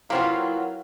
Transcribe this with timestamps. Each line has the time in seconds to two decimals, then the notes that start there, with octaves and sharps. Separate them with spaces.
0.10 F#3 A#3 C4 E4 F4 A#4 B4